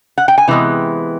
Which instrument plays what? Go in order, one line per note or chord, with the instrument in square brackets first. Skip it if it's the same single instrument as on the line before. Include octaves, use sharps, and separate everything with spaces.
[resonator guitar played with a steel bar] F#5
G5
G#5
C3 E3 G#3 B3